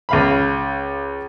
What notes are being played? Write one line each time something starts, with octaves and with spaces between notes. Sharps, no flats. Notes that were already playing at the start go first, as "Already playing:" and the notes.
C#2 F5 B5